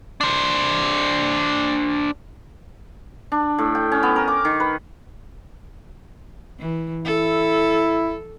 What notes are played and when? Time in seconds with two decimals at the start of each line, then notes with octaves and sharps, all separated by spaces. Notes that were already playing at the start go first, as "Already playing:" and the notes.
0.21 D4 C5
3.32 D4
3.59 A2
3.75 G5
3.92 C#4
4.03 B3
4.16 A#4
4.28 D6
4.45 D#3
4.60 B4
6.59 E3
7.05 E4 A4